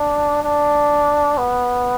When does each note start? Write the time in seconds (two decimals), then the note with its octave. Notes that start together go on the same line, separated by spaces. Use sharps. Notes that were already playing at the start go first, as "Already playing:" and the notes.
Already playing: D4
0.43 D4
1.38 B3